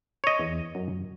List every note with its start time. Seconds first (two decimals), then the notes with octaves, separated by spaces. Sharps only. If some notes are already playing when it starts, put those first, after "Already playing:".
0.24 C#5 D#5
0.39 E2
0.75 F#2